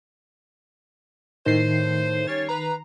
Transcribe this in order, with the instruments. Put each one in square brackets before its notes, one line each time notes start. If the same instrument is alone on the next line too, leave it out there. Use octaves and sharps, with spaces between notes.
[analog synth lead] A2 [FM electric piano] D#3 C7 [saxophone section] C5
[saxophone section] G3 C#4 C#5 [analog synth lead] A6
[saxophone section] B4 [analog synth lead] A#5